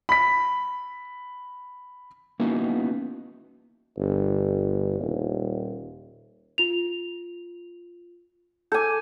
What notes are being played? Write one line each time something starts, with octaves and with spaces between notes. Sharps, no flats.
B5 B6
A#3 B3 C#4 D#4 E4 F#4
G1
D#1
F4 F7
A4 G#5 D6 G6